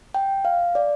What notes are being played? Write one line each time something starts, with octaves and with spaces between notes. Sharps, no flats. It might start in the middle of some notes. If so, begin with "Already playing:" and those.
G5
F5
D5